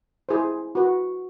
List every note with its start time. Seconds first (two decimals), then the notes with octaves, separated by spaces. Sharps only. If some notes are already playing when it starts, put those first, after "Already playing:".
0.29 E4 G#4 C5
0.75 F#4 B4